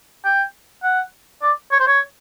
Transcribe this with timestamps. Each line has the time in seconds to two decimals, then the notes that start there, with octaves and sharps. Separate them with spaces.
0.25 G5
0.83 F#5
1.42 D5
1.72 C#5
1.80 C5
1.87 C#5